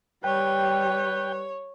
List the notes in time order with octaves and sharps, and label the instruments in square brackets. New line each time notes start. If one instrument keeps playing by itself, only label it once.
[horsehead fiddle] G3 [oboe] B4 [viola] C#5 [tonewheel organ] G5